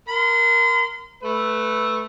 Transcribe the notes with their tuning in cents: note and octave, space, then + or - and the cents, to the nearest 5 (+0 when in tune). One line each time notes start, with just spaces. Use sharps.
A#4 +0 C6 -40
A3 -5 B4 +0